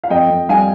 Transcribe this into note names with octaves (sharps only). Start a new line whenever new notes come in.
F5
F2 D#5 G5
F2
G3 F5 G#5